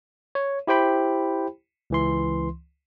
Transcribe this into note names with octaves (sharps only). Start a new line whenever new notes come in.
C#5
E4 G4 C5 G5 B5
C#2 E3 C6